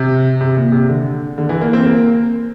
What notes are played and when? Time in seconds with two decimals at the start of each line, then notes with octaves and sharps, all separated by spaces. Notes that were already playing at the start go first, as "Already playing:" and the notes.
Already playing: C3
0.41 C3
0.56 A#2
0.72 C3
0.89 D3
1.38 D3
1.49 E3
1.61 A#3
1.73 C4
1.86 A#3